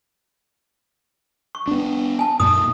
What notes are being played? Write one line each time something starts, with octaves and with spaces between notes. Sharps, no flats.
C#6
B3 D4
G#5 A5
F#2 A#2 A#3 D#4 D#6